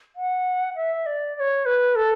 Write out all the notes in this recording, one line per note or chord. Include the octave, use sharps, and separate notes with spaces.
F#5
E5
D5
D5
C#5
B4
A4